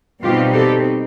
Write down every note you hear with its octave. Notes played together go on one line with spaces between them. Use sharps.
B2 G3 C4 D#4 F4 G4
G4 A4